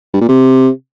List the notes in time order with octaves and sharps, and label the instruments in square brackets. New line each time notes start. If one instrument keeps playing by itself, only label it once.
[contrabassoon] G2
A#2
C3